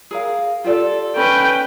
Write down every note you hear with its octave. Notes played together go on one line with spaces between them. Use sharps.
G#4 A#4 F5
F4 G4 A4 D5
C#4 B4 G5